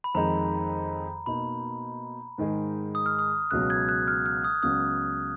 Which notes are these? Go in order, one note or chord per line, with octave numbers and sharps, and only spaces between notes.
B5
F2 D#3 G#3 D#4 A#5
B2 A#3 D#4 B5
G#2 D#3 G#3 D#4 G#4
D#6
F6
D#6
C#2 B2 F#3 F#6
G#6
F#6
F6
F6
D#6
C#2 C#3 F#3 B3 D#6